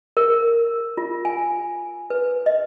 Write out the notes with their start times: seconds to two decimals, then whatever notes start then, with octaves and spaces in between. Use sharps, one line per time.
0.17 A#4
0.97 F4
1.25 G#5
2.10 B4
2.46 D#5